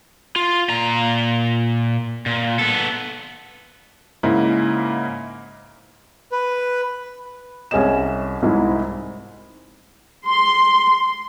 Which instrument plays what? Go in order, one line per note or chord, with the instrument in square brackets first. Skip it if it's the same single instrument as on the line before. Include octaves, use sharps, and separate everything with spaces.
[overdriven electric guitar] F4
A#2 A#5
A#2
B3 A4
[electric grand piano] G#2 C#3 A#3 D#4 E4
[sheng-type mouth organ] B4
[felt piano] C2 C#4 G#4 C#5 D#5 E7
C2 G#2 G#3 E4
[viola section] C6